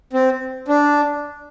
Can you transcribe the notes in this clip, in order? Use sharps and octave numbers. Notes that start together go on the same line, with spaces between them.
C4
D4